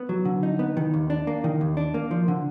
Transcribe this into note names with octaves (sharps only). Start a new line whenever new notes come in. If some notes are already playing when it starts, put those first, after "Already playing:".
Already playing: B3
F#3
D3
D#4
B3
D#3
D#2
D4
A#3
D#3
D#2
D4
A#3
F3
D3